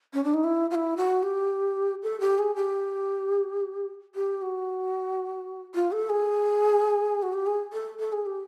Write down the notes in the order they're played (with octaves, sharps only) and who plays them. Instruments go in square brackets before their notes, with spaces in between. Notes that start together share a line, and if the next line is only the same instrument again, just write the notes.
[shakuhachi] C#4
D4
D#4
E4
F4
E4
F#4
G4
A4
G4
G#4
G4
G4
F#4
F4
A4
G#4
F#4
G4
G#4
A4
A4
G#4
G4